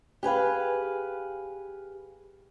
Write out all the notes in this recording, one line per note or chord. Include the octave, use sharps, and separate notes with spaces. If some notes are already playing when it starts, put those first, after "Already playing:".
G4 G#4 B4 F5